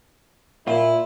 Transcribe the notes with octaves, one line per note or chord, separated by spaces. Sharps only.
A#2 E4 F4